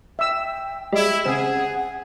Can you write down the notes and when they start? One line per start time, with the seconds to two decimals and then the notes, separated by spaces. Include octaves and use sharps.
0.19 E5 G5 E6
0.92 G3 G#3 E4
1.24 C#3 C4 G#4 F#5 E7